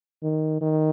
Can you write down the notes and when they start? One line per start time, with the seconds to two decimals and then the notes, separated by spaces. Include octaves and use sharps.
0.23 D#3
0.62 D#3